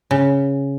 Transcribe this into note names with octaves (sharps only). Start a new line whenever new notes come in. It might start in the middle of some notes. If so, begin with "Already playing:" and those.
C#3